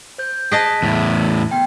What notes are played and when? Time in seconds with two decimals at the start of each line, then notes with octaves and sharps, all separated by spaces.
0.18 C5 G6
0.52 G#4 D#5 A5 F#6 B6 D7
0.82 E2 A2
1.51 B3 G5